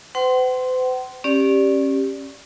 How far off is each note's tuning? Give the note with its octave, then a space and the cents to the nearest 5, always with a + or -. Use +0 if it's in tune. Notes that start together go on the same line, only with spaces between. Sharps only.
C5 -45 F#5 +40 C6 +0
C#4 -25 G4 +0 D5 -5